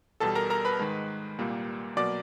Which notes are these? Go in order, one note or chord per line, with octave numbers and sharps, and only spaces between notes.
E2 B2 G3 A4 A5
A#4 A#5
A#4 A#5
B4 B5
G#2 D#3 G#3
C2 A#2 G3 A#3
B2 F#3 A#3 D5 D6